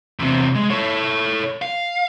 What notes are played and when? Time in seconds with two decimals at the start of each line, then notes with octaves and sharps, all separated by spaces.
0.19 E2 C3
0.55 G#3
0.70 A4 C#5
1.62 F5